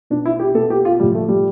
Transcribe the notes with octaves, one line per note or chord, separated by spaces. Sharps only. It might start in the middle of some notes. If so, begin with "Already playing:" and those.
B2 D4
E4
G4
B2 A4
G4
F4
A2 F3 G3
A3
G3